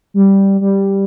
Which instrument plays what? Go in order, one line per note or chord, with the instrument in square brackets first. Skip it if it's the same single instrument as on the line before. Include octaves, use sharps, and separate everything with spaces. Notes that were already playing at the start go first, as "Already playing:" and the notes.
[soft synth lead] G3
G3